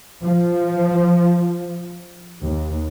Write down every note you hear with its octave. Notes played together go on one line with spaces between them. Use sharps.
F3
D#2